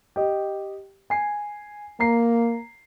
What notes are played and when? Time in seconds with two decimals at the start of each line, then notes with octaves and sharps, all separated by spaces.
0.16 G4 D#5
1.10 G#5 C7
2.00 A#3 A#5 C7